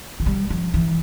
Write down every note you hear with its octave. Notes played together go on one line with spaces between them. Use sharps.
F3
G3
F3
E3